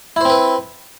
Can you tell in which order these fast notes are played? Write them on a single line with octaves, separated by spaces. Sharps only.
E4 C5 C4 B4